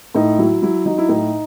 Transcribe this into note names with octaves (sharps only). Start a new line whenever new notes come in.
A2 D#4
F#3 E4
F#3 E4
F#3 D#4
E4
A2 D#4